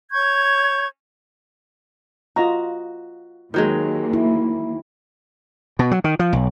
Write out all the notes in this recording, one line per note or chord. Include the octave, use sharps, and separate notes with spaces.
C#5 C#6 G6 G#6
F4 F#4 D#5 A#5
D#2 D#3 F#3 G#3 A#3
E4
B2
F#3
D#3
F3
B1